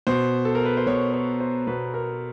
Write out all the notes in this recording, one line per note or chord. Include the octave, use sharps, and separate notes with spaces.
B2 C5
A4
A#4
B4
C5
B2 C#5
C#5
C5
B2 B4
A#4